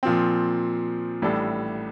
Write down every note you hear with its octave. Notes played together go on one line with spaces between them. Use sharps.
A#2 F3 C4
A1 A2 G3 D4 A4